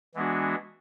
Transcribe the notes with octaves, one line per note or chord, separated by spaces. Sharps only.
E3 G#3 B3 D4 F#4